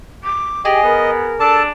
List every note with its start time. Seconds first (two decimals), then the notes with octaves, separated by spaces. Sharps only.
0.24 D6
0.65 G4 G#4 D#5
0.84 B3 A#4
1.40 D4 A4 A5